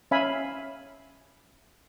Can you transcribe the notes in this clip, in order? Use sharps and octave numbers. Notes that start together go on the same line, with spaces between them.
C#4 E5 F5 G#5 B5